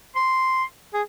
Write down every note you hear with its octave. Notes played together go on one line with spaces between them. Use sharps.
C6
G#4